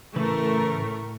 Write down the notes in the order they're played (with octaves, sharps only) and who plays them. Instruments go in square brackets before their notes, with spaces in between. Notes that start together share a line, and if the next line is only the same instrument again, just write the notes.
[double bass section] A2 [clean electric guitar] C#3 E3 B4 [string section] A3 [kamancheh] A#4 C#6